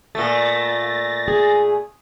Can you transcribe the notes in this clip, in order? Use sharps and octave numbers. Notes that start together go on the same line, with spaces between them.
A#2 A3 A6 A#6
G#4 G#5